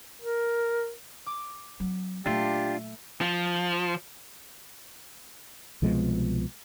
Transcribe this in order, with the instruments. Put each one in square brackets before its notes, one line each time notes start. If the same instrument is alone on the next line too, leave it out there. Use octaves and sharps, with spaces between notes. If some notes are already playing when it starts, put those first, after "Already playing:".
[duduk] A#4
[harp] D6
[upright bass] F#3 C4
[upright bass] A#2 F#3 [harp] A3 [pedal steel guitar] D4 F4 [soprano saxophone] G4
[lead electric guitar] F3
[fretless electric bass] C2 B2 F3 G#3